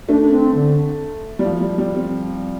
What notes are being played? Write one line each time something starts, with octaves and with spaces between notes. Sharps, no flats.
A3 D4
D4
C4
D3
G3
F3
G3
G3
C4